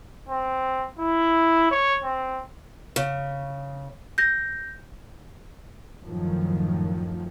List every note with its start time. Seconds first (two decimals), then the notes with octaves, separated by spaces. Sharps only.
0.29 C4
0.99 E4
1.71 C#5
2.04 C4
2.96 C#3
4.18 G6 A#6
6.02 F#2 A2 D#3 F3 F#3